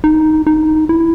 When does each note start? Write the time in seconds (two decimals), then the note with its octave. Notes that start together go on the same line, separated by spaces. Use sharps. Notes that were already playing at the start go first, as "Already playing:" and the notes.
0.04 D#4
0.47 D#4
0.89 E4